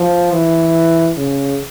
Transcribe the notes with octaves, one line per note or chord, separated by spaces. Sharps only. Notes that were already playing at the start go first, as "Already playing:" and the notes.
Already playing: F3
E3
C#3